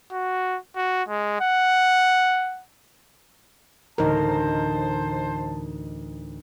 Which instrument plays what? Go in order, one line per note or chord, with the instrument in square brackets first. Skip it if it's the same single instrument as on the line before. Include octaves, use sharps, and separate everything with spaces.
[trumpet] F#4
F#4
G#3
F#5
[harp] D2 A2 E3 [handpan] D#4 A#4 [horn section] C5 A5